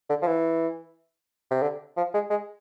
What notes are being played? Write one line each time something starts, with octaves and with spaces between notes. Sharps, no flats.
D3
F3
E3
C3
D3
F3
G#3
G#3